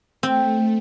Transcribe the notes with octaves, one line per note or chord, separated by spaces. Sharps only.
A3 C4